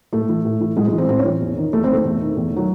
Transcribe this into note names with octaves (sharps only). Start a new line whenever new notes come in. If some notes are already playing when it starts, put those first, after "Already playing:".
A2 A3
E3
A2
E3
A2 G#3
G#3
E3
C4
A2 C4
C#4
E3
E2
D#3
E2 A3
C4
D#3 A3
E2
D#3
E2
D#3 F#3